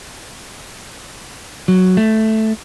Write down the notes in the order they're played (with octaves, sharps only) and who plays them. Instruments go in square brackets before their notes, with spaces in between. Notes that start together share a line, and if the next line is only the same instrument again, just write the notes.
[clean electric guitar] F#3
A3